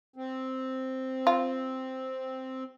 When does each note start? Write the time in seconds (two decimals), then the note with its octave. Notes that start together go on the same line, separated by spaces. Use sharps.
0.16 C4
1.27 F4